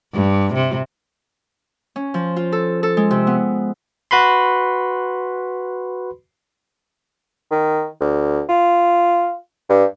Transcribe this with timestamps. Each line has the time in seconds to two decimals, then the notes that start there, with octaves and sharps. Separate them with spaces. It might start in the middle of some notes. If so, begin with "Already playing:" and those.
0.13 G2
0.54 C3
1.96 C#4
2.14 F3
2.36 F4
2.52 A4
2.83 A4
2.97 G#3
3.11 C3
3.27 B3
4.11 F#4 B4 B5 C6
7.51 D#3
8.01 D2
8.49 F4
9.69 G2